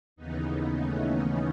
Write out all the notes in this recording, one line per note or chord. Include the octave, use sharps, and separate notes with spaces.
D#2 C#3 E3 B3 D#4
A3 C#4